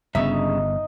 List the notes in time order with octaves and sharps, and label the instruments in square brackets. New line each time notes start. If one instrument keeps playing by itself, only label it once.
[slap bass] G1 B3 [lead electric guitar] G2 C#3 [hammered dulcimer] D#4 D#5 [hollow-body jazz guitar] E5